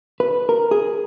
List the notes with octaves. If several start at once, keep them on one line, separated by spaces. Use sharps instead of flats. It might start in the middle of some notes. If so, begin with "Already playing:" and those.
B4
A#4
G#4